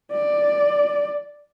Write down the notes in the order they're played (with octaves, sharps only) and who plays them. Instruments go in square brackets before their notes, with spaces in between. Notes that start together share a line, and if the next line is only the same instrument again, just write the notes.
[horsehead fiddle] D5